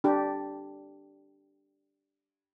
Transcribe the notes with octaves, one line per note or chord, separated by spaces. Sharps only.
D4 G4